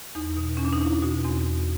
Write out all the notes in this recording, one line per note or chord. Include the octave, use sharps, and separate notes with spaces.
E2 D#4
B2
E2 C#4
D4
D#4
E2 E4
B2 F#4
E2 C4
E2